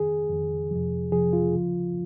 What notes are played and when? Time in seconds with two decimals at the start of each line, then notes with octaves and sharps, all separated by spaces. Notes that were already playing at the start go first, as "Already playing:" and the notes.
Already playing: F2 D#3 G#4
0.29 F2 D#3
0.71 F2 C3 F3
1.12 F2 C3 F3 G#4
1.33 F4
1.55 D#2 C#3 F3